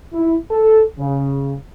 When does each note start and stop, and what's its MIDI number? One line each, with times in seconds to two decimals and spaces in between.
0.13 0.36 64
0.51 0.81 69
0.99 1.54 49